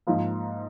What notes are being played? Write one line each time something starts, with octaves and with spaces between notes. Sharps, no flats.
G#2 F3 A#3